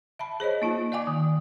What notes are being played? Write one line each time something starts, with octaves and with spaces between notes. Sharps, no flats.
E5 A5 B5
G#4 C5 C#5 D#5
A#3 D#4 F4
D5 F5 G5 G#5 D6
D#3